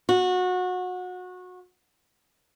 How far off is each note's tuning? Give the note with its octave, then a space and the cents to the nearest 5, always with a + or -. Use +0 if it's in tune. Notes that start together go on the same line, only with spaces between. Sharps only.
F#4 -25